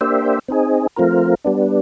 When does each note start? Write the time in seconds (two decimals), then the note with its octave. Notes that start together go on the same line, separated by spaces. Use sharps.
0.01 A#3 D4 G4 C5 E5
0.48 C4 D#4 G#4
0.97 F3 A3 C4 F4 A#4
1.44 G3 B3 D4